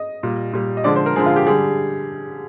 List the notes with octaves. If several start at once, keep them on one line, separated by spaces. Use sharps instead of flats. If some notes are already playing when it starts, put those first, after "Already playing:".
Already playing: D#5
A#2 G3
A#2 G3
D#5
D3 F3 G#3 D5
C5
A#4
D3 F3 G#3 G#4
F4
G4
D3 G3 G#4